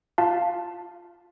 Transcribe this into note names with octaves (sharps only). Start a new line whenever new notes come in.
F4 F5 A5